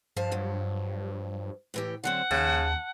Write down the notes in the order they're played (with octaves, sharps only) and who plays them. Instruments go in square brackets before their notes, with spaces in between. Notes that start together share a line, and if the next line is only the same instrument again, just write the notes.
[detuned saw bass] G2 [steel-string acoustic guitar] F3 F5 A5
[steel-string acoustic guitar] F3 F#3
A2 E3 G4
[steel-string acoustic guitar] D3 F#3 C4 [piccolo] F#5
[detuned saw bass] D#2 [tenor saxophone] C#3 [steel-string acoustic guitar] A5